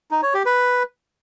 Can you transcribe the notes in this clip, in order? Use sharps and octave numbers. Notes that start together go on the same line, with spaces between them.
D#4
C#5
G4
B4